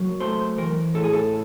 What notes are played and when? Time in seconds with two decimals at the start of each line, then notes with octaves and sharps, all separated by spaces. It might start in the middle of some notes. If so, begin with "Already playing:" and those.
Already playing: F#3 A#3
0.20 A3 C5
0.58 E3 A#4
0.94 A2 A4
1.04 G#4
1.13 A4